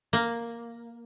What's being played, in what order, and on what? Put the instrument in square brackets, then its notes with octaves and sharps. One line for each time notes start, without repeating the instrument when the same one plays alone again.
[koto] A#3